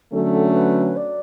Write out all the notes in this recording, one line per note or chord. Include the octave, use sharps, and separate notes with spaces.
D3 F#3 A3 C#4 A4
A4
B4
D5